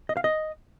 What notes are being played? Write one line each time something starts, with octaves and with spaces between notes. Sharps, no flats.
D#5
F5
D#5